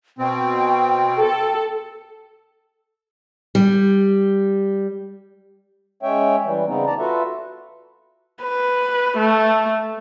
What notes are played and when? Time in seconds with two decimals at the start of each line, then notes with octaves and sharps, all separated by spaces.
0.19 B2 C4 G5
1.18 A4
3.55 G3
6.03 G#3 C#4 C#5 E5 G5
6.45 E3 G3
6.66 C#3 G3 B3 C4 D#4
6.86 D5 A5 A#5
6.99 F4 F#4 A4 B4 E5
8.43 B4
9.17 A3